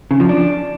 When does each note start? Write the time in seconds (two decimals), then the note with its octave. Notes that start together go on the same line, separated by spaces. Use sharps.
0.11 C#3
0.20 F3
0.29 D4